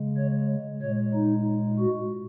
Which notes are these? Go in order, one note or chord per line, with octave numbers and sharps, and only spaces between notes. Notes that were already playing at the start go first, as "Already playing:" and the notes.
Already playing: C#3 G#3
C#5
A#2 G#3 C#5
D#4
F#4